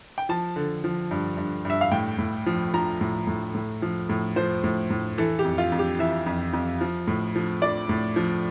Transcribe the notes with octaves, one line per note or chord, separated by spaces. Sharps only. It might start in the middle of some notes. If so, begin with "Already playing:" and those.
G5
F3 A5
D3
F3
G2
G2
G2 E5
F5
A2 G5
A2
F3
F3 A#5
A2
A2
A2
F3
A2
F3 C5
A2
A2
E3 A4
G4
F2
F4
F2
G4
E3 E5
F2
F2
F3
A2
F3
F3 D5
A2
F3